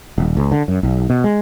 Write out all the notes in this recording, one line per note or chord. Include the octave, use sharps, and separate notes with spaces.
D#1
C#2
D3
F#2
B1
B2
G#3